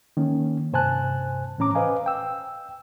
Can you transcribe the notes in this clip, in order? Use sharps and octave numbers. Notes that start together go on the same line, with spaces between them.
D#3 A#3 C#4
G2 C3 C5 G#5 A5 F#6
A2 E3 C#4 A#5 D6
B4 C5 D#5 F5 G#5
G5 E6